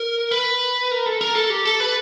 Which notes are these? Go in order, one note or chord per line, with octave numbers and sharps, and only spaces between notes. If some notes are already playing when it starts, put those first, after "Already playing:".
Already playing: A#4
B4
A#4
A4
A#4
A4
G4
A4
B4